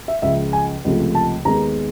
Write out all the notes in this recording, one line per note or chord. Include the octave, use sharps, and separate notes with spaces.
E5
C#2 C#3 F3 E5
G#5
C#2 C3 F3 A3
A5
D#2 D#3 G#3 B3 A#5